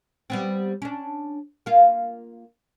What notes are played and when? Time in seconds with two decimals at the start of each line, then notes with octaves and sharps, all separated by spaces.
0.30 G3 B3 C4
0.82 C#4 D4
1.66 A#3 F4